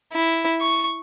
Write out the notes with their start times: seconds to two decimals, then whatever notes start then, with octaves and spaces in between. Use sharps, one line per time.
0.13 E4
0.61 C#6